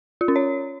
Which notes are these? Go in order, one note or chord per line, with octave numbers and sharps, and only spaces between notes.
F4
C#4
C#5